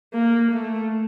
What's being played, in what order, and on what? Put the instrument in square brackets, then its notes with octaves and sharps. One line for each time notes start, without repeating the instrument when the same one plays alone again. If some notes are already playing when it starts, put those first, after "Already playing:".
[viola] A#3
A3